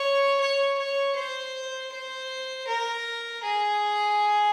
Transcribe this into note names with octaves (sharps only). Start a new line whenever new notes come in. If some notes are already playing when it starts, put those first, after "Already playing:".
Already playing: C#5
C#5
C#5
C5
C5
A#4
G#4